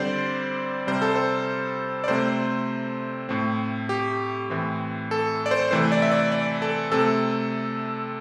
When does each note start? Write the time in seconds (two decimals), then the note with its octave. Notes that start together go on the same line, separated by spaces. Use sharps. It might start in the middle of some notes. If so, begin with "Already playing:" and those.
Already playing: D3 G3 C4 C5 D5
0.87 C3 G3 C4 C5
1.02 A4
1.15 C5
2.04 D5
2.08 C3 A3 C4 C5
3.29 A2 A3 C4
3.89 G4
4.50 A2 E3 C4
5.11 A4
5.46 D5
5.51 C5
5.71 C3 E3 A3 C4 C5
5.92 D5
6.02 E5
6.11 D5
6.32 D5
6.62 A4
6.92 C3 A3 C4 A4